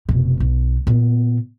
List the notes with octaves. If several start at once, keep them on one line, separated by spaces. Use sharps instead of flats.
F1 B2
B1
A#2 B3